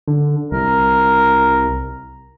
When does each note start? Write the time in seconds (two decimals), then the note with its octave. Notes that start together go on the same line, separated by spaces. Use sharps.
0.08 D3
0.52 C2 A#4